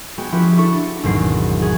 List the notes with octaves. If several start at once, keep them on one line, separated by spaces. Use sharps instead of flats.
G#3 B3 F#4 G5
F3 C#4 E4 F#4 G4 B4
D4 E4 A4 C#6
D4
G#1 E2 B2 F#3 C4 C7
F#4 G#4